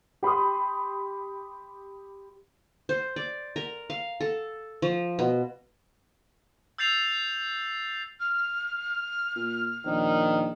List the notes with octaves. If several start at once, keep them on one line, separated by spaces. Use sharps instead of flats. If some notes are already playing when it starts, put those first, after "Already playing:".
G4 B5 C6 D#6
C5
D5
A#4
F5
A4
F3
B2
E6 G6 A6 C7 F7
F6
A#2
A#1 D#3